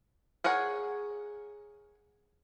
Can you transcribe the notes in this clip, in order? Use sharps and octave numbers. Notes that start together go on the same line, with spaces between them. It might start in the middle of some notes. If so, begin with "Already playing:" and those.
G#4 A#4 C#5 F#5